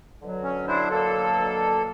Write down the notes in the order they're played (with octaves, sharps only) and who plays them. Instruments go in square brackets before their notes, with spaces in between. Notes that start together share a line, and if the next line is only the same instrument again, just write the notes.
[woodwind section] B2 D3 F#3
[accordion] C#4
D4 E4 C5
A#3 A4